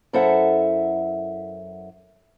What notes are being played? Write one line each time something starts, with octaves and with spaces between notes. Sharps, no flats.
F#2 E4 A4 C5 E5 F#5